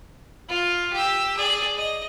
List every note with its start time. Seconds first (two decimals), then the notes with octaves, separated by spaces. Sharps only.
0.49 F4
0.93 G4 E6
1.37 G#4 D5
1.77 D#5